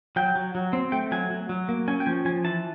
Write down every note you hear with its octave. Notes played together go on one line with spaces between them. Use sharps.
F#3 G5
F#3
F#3
C4
A3 G5
F#3 G#5
F#3
F#3
A#3
C#4 G#5
G5
F3 G#5
F3 G#5
E3 A5